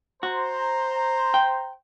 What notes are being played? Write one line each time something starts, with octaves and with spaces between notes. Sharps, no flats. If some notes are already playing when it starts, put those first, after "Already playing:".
F#4 C5 A#5
G5